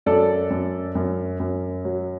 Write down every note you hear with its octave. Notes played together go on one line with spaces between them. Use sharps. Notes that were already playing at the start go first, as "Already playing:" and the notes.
F#2 A4 D5
F#2
F#2
F#2
F#3